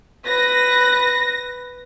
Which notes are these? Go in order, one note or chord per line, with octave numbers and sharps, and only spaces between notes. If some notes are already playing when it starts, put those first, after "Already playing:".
B4 A#6